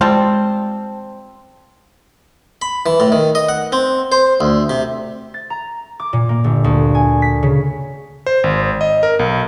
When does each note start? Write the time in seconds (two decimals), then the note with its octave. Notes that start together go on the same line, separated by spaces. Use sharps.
0.01 F3 G3 G#3 C4 C5 G5 A5
2.62 B5
2.86 E3
3.00 A2
3.12 D#3
3.35 D#5
3.49 F#5
3.72 C4
4.12 C5
4.41 D2
4.70 C3
5.34 A6
5.50 A#5
6.00 D6
6.13 A#2
6.29 A#3
6.44 G1
6.64 D2
6.95 G#5
7.22 B6
7.43 C#3
8.26 C5
8.44 G#1
8.81 D#5
9.03 A#4
9.19 B1